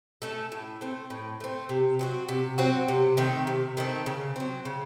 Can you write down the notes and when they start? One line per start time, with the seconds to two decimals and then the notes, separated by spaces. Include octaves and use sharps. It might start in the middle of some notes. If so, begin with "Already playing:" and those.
0.22 A3 C#4 A4
0.52 A2
0.81 A3 C4
1.10 A2
1.40 A3 C4
1.69 C3
1.99 F#3 C4 F#4
2.29 C3
2.58 F#3 C4 F#4
2.88 C3
3.17 D#3 A3 C4
3.47 C3
3.77 D#3 A3 C4
4.06 C#3
4.36 F#3 C4
4.65 C#3